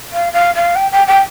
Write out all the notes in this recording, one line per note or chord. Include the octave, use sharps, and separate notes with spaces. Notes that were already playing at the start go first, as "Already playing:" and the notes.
F5
F5
F5
G5
G5
G5